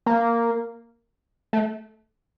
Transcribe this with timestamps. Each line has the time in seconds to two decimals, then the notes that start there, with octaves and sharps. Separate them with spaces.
0.06 A#3
1.53 A3